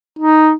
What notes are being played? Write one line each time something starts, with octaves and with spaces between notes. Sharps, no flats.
D#4